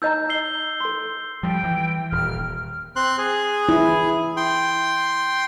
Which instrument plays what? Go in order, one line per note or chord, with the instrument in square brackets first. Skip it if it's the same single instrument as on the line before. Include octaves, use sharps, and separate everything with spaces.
[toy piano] D#4 D#5 A#5 [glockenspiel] E6 G6
[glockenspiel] E6 C7 G7
[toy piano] A4 C6
[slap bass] F3 G3 [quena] G5
[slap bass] E3
[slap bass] D#1 [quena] F6
[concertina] C4 C6 F#6
G#4
[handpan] E4
[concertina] G5 C6